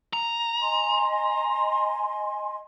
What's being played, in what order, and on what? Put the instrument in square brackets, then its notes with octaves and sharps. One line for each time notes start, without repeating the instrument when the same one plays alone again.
[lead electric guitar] A#5
[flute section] D#5 G#5 C6